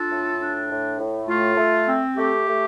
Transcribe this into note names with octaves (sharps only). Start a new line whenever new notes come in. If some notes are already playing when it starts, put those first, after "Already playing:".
Already playing: D4 F4 A4
A2
D4
A2
A2
A3 F4
A3
C4
A3 G4
A3